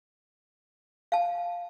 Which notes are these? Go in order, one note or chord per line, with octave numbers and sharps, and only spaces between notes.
F5 A5